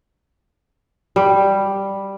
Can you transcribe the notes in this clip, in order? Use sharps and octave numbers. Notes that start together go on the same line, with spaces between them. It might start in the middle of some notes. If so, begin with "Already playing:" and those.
G3